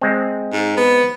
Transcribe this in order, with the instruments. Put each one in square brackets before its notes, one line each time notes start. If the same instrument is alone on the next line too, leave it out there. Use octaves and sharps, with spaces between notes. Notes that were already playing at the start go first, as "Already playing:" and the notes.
[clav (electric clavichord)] G#3 C4
[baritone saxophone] G#2
B3